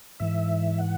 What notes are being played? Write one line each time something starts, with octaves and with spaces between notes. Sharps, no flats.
G#2 E3 E5
F#5